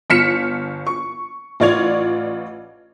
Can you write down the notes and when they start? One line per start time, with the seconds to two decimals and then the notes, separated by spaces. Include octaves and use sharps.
0.10 G1 F6 B6 C#7 E7
0.87 C#6
1.60 A1 F4 D5 C#6 G#6 F7